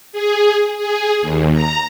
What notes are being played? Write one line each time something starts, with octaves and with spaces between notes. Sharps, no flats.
G#4
G#4
D#2
A#5